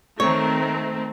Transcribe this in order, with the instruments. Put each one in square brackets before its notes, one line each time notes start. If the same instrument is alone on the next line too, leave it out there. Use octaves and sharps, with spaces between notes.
[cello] D#3 A#4 [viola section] A3 C4 [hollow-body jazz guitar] C#5